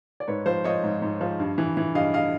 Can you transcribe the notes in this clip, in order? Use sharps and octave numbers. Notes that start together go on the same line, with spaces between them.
D5
G#2 B4 C#5
F3 C5
F3 C#5 D#5
G#2
G#2
F3
G2
E3
E3
G2 D#5 F5
D#5 F5